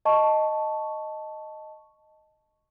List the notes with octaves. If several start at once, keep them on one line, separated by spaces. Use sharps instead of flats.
D#5 A5 C#6